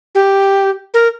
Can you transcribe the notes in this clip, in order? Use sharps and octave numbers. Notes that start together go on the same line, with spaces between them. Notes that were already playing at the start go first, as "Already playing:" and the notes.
G4
A#4